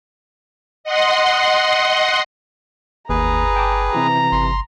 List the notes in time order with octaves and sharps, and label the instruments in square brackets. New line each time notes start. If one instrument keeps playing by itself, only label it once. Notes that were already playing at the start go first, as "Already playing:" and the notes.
[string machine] D#5 F#5 C6
[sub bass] G1 [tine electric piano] D#2 [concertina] G#4 B4 [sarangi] A#5
[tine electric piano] G5 A5 D6
[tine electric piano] C3 E3 G4 [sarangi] A#5
[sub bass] G1 [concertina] C6